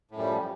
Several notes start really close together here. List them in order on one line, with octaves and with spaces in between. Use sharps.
A2 F#2 G3 F3